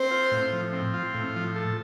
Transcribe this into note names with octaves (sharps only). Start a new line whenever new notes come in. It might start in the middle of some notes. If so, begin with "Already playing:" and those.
Already playing: C4 C5
F4
A2
F3
C4
F4
A2
F3
A4